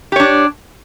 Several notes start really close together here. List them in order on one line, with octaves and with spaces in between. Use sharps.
G4 C#5 D4